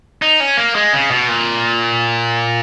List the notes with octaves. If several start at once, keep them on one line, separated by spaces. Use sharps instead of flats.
D#4
C#4
A#3
G#3
C#3
B2
A#2